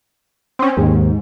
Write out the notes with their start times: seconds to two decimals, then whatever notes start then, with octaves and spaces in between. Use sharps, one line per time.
0.59 C4 C#4
0.77 D#2 G#2